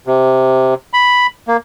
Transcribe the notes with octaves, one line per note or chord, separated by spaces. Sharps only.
C3
B5
A#3